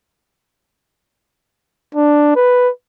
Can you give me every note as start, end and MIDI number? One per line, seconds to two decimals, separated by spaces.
1.95 2.31 62
2.36 2.70 71